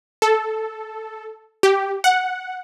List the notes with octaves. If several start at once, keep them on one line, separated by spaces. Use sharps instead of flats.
A4
G4
F#5